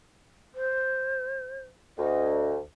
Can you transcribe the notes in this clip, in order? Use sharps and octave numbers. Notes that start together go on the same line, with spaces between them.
C5
D2 D#5